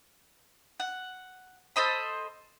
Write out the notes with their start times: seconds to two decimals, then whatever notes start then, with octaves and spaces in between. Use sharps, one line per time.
0.80 F#5
1.76 A4 C5 D#5 B5